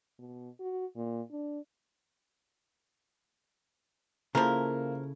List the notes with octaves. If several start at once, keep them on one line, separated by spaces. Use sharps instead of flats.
B2
F#4
A#2
D4
C#3 F3 A#3 E4 A4 A#4